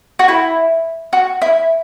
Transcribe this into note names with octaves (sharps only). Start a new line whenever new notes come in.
F#4
E4
F#4
E4